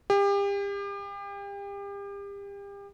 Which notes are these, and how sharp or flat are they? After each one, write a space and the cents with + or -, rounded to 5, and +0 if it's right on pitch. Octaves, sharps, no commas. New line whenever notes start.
G4 +35